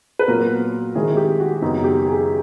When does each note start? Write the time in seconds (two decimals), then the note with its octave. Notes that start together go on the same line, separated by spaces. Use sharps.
0.19 B4
0.28 A#2 F#3 B3 A#4
0.95 D#3 G#3 C4 E4 G#4
1.17 G4
1.40 F#4
1.62 F#2 C#3 F#3 B3 D#4 F#4
1.84 G4
2.07 G#4